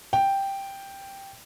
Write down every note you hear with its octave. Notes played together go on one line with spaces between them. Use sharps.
G5